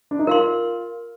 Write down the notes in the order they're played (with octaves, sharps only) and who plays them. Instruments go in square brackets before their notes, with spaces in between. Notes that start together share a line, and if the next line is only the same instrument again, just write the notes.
[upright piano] D4
D#4
[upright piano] F4 [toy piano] A#4 F5 C6